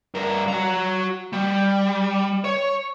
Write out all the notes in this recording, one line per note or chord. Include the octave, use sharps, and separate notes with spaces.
G2 A#4
F#4 A#5
G3
C#5